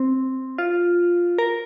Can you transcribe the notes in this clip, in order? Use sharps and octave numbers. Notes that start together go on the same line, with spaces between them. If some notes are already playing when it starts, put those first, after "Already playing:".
Already playing: C4
F4
A#4